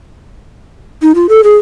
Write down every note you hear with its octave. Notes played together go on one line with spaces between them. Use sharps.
D#4
F4
A4
G#4